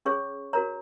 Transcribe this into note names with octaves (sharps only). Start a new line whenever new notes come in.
C#4 G#4 C#5 C#6
F#4 A#4 C#5 A#5